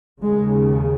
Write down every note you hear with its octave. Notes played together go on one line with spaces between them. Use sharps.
D#2 C#3 G#3